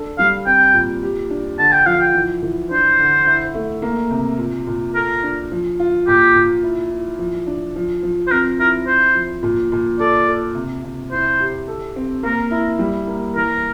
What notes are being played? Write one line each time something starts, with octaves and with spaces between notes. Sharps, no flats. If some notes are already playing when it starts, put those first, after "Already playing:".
Already playing: D4 A4
G3 F5
C4 G5
A#2
G4
D4
D3 A5
G5
F3 F5
G5
E3
E3
D4 C5
D3
E4
A3
A#3
C3
A#2
A#2
A4 A#4
D4
F3
F4
A#2 G4
A#2
E4
E4
F3
D4
F3
F3
C5
C4 A#4
E4 A#4
E4 C5
F3
A#2
A#2
A4 D5
A4
C3
C3
E4 C5
G4
A4
C4
A#3 A#4
E4
G3
A#3
E3 A#4